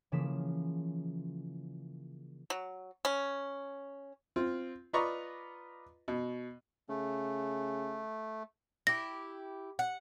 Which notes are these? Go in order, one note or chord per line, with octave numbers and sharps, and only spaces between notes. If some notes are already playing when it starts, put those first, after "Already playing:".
C#3 E3 F3 A#3 B6 E7
F#3
C#4
C4 F4
F4 B4 D5 D#5 A#5 C#6
B2
C#3 A3
E4 G4 A#6
F#5